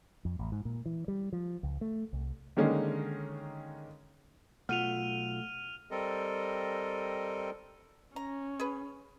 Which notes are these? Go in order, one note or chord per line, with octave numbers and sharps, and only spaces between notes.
F2
A1
G#2
A#2
E3
G3
F3
C#2
A3
C2
D3 D#3 G#3 A#3 C#4 D#4
B1 A3 F4 F#5 F6 D#7 F7
G3 C4 A4 A#4 D#5
C#4 A#5
G#4 B4